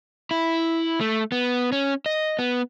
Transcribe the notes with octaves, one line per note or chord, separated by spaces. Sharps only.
E4
A3
B3
C#4
D#5
B3